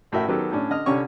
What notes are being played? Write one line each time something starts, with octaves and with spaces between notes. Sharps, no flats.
A1 A2 F#4 A#4 E5 G5
D#3 F#3 B3 G4 A4
A2 C#4 D4
D3 D#5 F6
C2 D3 C#4 G4 C#5 C#6